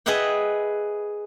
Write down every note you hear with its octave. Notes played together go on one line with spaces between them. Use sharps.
G#4 B4 D#5 E5 F#5 G5